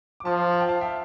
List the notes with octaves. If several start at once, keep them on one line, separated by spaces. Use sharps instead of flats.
D6
F3 A5 C6
A5
G5
F5 A5
E5 G5